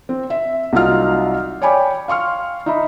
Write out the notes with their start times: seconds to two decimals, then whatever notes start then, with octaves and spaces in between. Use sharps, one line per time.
0.09 C4
0.30 E5
0.73 C2 F#3 D#4 F4 F5 F6
1.62 C#5 D5 G5 G#5 B5 D6
2.08 F5 C6 C#6 F6
2.66 D#4 E5 B5